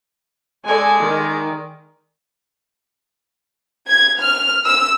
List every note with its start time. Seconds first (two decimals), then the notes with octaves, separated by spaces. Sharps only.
0.65 G#3 A4 D5 G#5
1.00 D#3
3.89 G#6
4.21 F6
4.65 E6